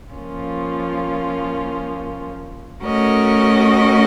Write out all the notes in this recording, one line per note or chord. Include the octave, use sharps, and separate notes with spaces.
F3 A#3 C#4 F4
A3 C#4 F#4 A#4 D#5